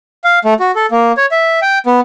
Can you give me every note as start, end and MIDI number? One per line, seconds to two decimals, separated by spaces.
0.24 0.39 77
0.45 0.54 57
0.60 0.71 66
0.75 0.86 69
0.91 1.12 58
1.17 1.26 73
1.31 1.60 76
1.62 1.79 79
1.86 2.00 59